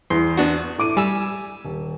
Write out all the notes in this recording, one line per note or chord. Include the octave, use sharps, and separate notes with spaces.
E2 C6
B3 D4 F#4
A2 D6 D#7
G3 G#5 E6
D#1